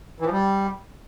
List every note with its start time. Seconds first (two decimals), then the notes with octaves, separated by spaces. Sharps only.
0.20 E3
0.26 F3
0.31 G3